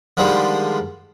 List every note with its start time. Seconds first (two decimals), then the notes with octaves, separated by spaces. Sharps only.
0.17 D3 D#3 F3 G3 G#3